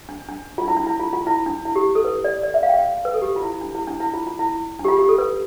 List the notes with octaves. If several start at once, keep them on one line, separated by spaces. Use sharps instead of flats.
D4
D4
F4
D4
E4
D4
E4
F4
F4
E4
D4
E4
G4
A4
B4
D5
D5
E5
F5
G5
F5
B4
A4
G4
F4
E4
D4
E4
D4
E4
F4
F4
E4
D4
G4
F4
G4
A4
B4